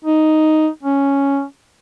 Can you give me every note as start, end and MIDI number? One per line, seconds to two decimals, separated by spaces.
0.04 0.68 63
0.83 1.44 61